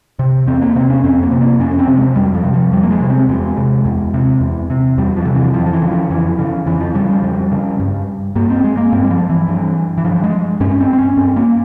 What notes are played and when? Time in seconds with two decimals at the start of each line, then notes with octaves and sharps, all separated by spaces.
0.19 C3
0.47 E2 C4
0.62 A#3
0.75 C3 C4
0.90 C#4
1.04 F2 C4
1.23 A#3
1.31 C3
1.41 A#3
1.59 F2 C#4
1.79 C4
1.88 C3
1.98 G#3
2.16 F2 G3
2.34 F3
2.44 C3
2.54 F3
2.73 F2 G3
2.83 A#3
2.91 G#3
3.00 C3
3.10 C4
3.29 E2 G#3
3.57 C3
3.85 E2
4.14 C3
4.41 E2
4.70 C3
4.98 E2 G3
5.16 F3
5.25 C3
5.35 E3
5.54 F2 F3
5.66 F3
5.73 E3
5.82 C#3
5.92 F3
6.10 F2 E3
6.39 C#3
6.66 F2 E3
6.80 F3
6.95 C#3 G3
7.09 G3
7.24 F2
7.52 C#3
7.80 G2
8.36 G2 A#3
8.50 C4
8.64 G#3
8.77 A#3
8.92 G2 C4
9.04 G3
9.10 F3
9.29 E3
9.48 G2
9.98 E3
10.05 G2 F3
10.24 G#3
10.60 G2 C#4
10.80 C4
10.93 C4
10.99 C#4
11.17 G2 C4
11.36 A#3